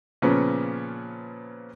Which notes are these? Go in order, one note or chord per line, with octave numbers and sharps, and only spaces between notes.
A#2 C#3 F3 B3 C#4